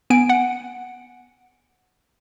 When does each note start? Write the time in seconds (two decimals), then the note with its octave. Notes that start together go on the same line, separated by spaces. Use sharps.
0.10 B3 G#5 D7
0.29 F#5